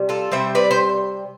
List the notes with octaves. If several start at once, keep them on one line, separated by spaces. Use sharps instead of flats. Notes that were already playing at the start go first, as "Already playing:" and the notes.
Already playing: C3 G3
F4 A4
C3 G3 C5 E5
B4 D5
C5